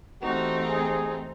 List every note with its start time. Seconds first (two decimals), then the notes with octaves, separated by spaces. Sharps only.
0.22 E3 A3 C4 D#4 F#4 G4
0.68 G#4